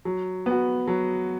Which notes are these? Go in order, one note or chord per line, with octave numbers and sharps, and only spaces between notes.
F#3
B3 F#4
F#3